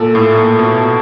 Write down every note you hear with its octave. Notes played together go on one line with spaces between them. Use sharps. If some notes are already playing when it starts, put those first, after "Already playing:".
Already playing: A#2 A4
A2
A#2
B2